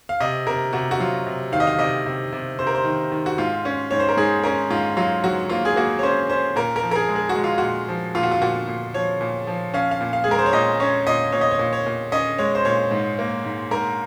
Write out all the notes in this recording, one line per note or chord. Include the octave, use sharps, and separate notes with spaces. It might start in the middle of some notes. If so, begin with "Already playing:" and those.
F5
C3 D#5
C3 A#4
C3 F#4
F#4
F#3 F4
C3
D#3 F5
D#5
F5
C3 D#5
C3
C3
C3 C5
A#4
C5
D#3
D#3
F#4
G#2 F4
C#4
G#2 C#5
C5
A#4
G#2 G#4
C#4 A#4
G#2 F4
F#3 F4
F#3 F#4
A#3 F4
G#4
A#3 F#4
C#5
C#4 C5
C#4 C5
A#2 A#4
A#4
F3
A#4
G#4
G#3
G#4
F#4
G#3
F4
A#2 F#4
F3
A#2 F4
F#4
F4
A#2 F#4
A#2
F3 C#5
A#2
F3
C#4 F5
F5
A#2
F5
G#4
G#3 A#4
C5
C#5
A#2 D#5
C#4 C#5
A#2 D#5
A#2 C#5
D#5
C#5
A#2
C#5
A#2
C#4 D#5
G#3 C#5
C5
A#2 C#5
G#2
A#3
G#2
G#2 A#4